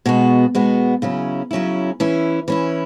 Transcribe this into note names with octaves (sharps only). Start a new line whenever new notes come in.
B2 G#3 B3 F#4
B2 G#3 B3 F#4
C#3 F#3 C#4 E4
C#3 F#3 C#4 E4
E3 C#4 E4
E3 C#4 E4